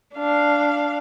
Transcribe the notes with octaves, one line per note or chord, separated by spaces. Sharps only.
D4 F5